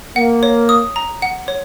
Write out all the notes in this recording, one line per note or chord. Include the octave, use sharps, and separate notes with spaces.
A#3 F#5
C#5
D#6
A#5
F#5
C#5